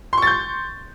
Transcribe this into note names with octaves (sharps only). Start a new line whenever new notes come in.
C6 C#6 G6 A6